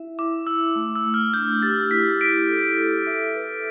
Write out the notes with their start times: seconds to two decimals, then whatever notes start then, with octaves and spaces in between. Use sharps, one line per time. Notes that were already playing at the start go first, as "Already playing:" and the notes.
Already playing: E4 E5
0.19 E4 D6
0.47 E4 E6
0.75 A3
0.96 E6
1.05 A3
1.14 F6
1.34 D4 G6
1.62 G4 A6
1.91 E4 B6
2.20 E4 B6 D7
2.49 A4
2.78 A4
3.07 E5
3.35 B4